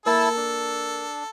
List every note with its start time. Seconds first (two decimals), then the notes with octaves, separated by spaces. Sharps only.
0.06 A#3 E4 A4 A5 E6
0.37 D4